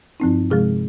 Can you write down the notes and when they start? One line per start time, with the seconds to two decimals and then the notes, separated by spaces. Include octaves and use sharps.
0.20 G2 F3 C4 D#4
0.51 C3 F3 G#3 G#4